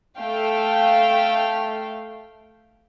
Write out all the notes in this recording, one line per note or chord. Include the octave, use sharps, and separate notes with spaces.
A3 F5 G5